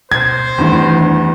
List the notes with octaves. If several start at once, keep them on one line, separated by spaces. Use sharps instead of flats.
B2 C5 G#6
E2 G2 D#3 A3